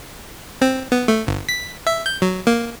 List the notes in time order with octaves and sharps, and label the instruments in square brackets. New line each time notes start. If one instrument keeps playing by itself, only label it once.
[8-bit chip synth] C4
B3
A3
G1
B6
E5
G6
F#3
A#3